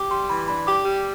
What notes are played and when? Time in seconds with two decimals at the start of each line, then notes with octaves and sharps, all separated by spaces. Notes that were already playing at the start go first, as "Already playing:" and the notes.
Already playing: G4 D6
0.11 G3 C6
0.30 E3 B5
0.48 D4 B5
0.66 G4 D6
0.85 G3